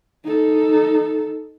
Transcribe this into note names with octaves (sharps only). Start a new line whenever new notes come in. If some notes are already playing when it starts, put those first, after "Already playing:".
D#4 A4